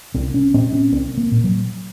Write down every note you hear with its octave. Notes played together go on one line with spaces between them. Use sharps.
C2 C4
C#4
A#2 C4
C#4
C2 C4
A#3
A#2
F#3